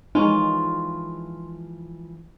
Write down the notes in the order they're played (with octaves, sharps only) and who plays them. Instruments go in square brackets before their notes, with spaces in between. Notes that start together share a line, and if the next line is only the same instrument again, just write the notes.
[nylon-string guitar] E3 F3 G#3 [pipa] C#4 F4 [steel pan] D#4